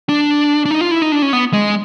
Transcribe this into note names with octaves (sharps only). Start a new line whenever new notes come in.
D4
D4
D#4
F4
E4
D#4
D4
C#4
B3
G#3